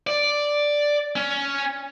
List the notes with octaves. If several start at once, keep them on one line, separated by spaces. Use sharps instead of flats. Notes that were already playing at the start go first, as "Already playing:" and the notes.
D5
C#4